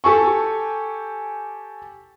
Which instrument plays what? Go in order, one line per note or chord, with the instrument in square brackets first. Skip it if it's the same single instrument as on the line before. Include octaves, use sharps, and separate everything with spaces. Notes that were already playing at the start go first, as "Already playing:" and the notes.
[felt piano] G4 A4 G#5 C#6